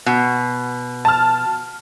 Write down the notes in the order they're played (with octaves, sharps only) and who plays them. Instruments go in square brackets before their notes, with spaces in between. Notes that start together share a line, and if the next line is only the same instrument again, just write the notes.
[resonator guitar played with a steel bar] B2
[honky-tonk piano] A5 F6